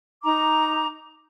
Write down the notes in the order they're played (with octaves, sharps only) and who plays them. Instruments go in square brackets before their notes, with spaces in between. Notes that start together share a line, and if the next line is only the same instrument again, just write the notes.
[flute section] D#4 A#5 D6